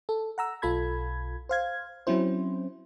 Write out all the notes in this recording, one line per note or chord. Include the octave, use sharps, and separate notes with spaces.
A4
F#5 A#5 E6
B1 F4 A4 B5 G#6
C5 F5 G#6
F#3 C4 C#4 E4 C5